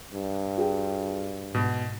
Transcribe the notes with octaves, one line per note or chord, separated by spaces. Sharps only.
G2
F#4 G#4 G5
G#2 B2